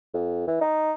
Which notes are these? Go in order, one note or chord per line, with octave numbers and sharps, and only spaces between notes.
F2
E3
D#4